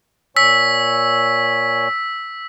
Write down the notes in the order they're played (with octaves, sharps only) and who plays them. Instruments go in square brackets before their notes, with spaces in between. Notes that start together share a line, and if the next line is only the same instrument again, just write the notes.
[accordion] A#2 C#5 G#5 [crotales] E6 B6